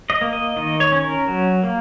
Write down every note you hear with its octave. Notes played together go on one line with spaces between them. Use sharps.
D#5
A#3
D#5
D#3 D#5
C#5
C#4
A#4
F#3
A#3